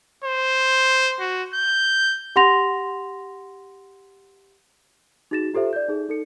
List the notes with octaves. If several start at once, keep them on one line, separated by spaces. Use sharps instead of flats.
C5
F#4
G6
G4 F#5 C6 A#6 F7
D#4 F#4 G#4 A6 A#6 E7
F4 G4 A4 C5 E5
D5 G6
D#4 G#4
D#4 A4 C#7